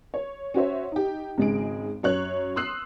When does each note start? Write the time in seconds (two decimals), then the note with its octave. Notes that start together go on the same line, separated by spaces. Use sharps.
0.14 C#5
0.54 C#4 F#4 C5 C#5 E5
0.92 D#4 G4
1.38 G#1 C#3 G#3 D#4 G#4 D7
2.03 F#2 C#5 F#6
2.56 C6 D#6 E6 F#6 C7